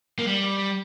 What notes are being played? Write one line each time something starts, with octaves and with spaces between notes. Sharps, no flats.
A#3
G3